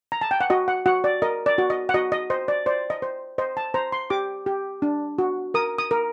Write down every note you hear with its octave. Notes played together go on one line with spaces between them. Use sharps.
A#5
A5
G5
F#5
F#4 D#5
F#5
F#4 F#5
D5
A#4 D#5
D5
F#4
D#5
F#5
F#4 D#5
D#5
C5 D#5
D5
C5 D5
D#5
C5
C5 D#5
A5
C5 A#5
C6
G4 D6
G4
D4
F#4
A#4 D#6
D#6
A#4